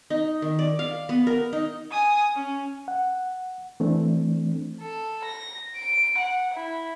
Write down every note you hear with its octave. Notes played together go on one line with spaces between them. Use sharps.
D#4
D#3
D5
F5
B3
A#4
D#4
G#5 D#6
C#4
F#5
E3 A3 C4 D4
A4
A#6
D7
F#5
E4